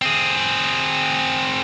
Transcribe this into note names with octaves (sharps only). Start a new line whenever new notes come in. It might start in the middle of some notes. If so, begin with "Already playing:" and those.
C4 G#4